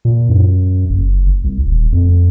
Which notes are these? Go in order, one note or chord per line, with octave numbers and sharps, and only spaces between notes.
A#2
F#2
F#1
C2
D#1
F2